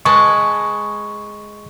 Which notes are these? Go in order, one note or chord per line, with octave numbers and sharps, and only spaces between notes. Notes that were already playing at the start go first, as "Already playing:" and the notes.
G#3 B4 A5 C#6